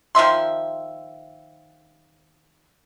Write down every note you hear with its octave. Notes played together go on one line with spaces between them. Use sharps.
D#3 F3 E5 C6